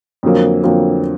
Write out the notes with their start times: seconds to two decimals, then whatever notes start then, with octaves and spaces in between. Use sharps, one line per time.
0.23 F2 D3 F#3 A#3
0.63 F2 D3 F#3 A#3